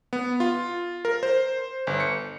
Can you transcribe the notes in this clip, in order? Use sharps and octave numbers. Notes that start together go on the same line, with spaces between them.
B3
F4
A#4
C5
G1
C#7